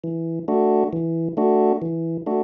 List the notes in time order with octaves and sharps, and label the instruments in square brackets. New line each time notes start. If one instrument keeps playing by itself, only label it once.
[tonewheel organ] E3
A3 D4 F#4
E3
A3 D4 F#4
E3
A3 D4 F#4